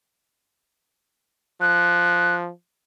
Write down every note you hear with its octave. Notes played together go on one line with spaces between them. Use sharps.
F3 F#6